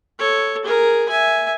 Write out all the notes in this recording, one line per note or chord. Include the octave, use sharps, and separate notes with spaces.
A4 C#5
G#4 A#4
E5 G#5